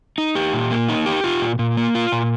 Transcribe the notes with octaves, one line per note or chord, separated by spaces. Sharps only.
D#4
G4
A#2
A#3
D#4
G4
F4
A#2
A#2
A#3
F4
A#2